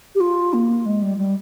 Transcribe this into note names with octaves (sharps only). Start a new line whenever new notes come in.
G4
F4
A#3
G#3
G3
G3